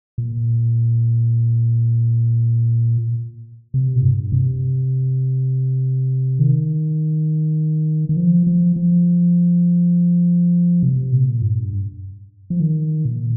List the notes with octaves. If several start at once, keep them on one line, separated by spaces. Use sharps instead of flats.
A#2
C3
A#2
G2
C3
D#3
D#3
F3
F3
F3
C3
A#2
G2
F3
D#3
A#2